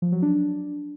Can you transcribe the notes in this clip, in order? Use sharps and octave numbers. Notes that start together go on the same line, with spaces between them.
F3
F#3
D4